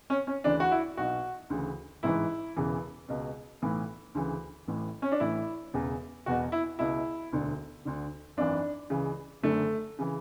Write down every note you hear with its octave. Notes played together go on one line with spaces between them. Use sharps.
C#4
C#4
D2 C#3 E3 D4
F#4
E4
B1 B2 F#4
D2 C#3 E3
A1 G#2 E3 E4
E1 E2 C#3 E3
C#2 B2
B1 A2 E3
D2 C#3 E3
A1 A2 E3
C#4
D4
A1 A2 E3 E4
E1 E2 C#3
E1 E2 B2 F#4
E4
C#2 B2 E4
E1 D2 D3
D2 D3
G#1 F#2 E3 D4
C#2 C#3 E3
F#1 F#2 D3 A3
C#3 E3